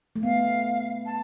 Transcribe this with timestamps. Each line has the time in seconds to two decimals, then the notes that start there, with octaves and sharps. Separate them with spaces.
0.16 A3
0.23 B3 F5
1.06 A5